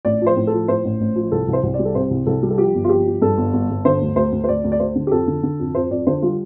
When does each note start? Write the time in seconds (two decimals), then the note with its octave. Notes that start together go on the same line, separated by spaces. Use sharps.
0.05 A1 D5
0.22 F3 C5
0.36 A2
0.47 A4
0.53 F3
0.68 A2 C5
0.84 A1
1.00 A1
1.16 F3
1.32 C2 A4
1.48 C2
1.53 C5
1.63 C2
1.74 D5
1.79 G3
1.85 A4
1.95 C3 C5
2.11 C2
2.26 C2 A4
2.43 G3
2.50 A4
2.58 F3 G4
2.74 G1
2.84 F4
2.89 F3 G4
3.06 F3
3.21 G2 A4
3.38 G1
3.53 G1
3.69 G1
3.85 D3 C5
4.01 D2
4.16 D2 C5
4.32 D2
4.44 C5
4.49 D2 D5
4.64 D2
4.72 D5
4.80 D2 C5
4.95 D3
5.07 G4
5.11 F2 A4
5.28 D3
5.43 D3
5.60 F2
5.75 F2 C5
5.90 F2 D5
6.07 D3 C5
6.22 G3 F4